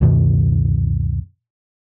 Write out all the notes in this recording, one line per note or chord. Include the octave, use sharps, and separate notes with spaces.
C#2 F#2 B2 D#3